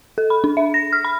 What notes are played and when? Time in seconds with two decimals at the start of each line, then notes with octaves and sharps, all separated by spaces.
0.18 A4
0.30 B5
0.44 D4
0.57 E5
0.74 A#6
0.93 F6
1.05 B5